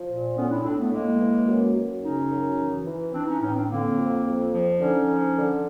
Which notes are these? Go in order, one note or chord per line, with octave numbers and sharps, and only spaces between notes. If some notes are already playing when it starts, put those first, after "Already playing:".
Already playing: F3
A#2
A2 B3 C#4
D4 E4
A2 C4 D4
A3 B3
A2 G#3 A#3
E3
F#2
F#2
C#3 C#4 D#4
F#2
E3
E3
E3 C4 D4
C#4 D#4
A2 C#4 D#4
C4 D4
D3 A#3 C4
F2
F2
F3
D3 C#4 D#4
F3
D3